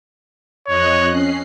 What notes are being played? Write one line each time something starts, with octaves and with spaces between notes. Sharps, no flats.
F2 C#5 D#5 F#6
C#4 C7